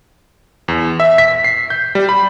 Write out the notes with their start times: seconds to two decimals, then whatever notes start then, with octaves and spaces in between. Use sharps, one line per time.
0.68 E2
1.00 E5
1.18 B6
1.44 C7
1.70 G6
1.95 G3
2.09 B5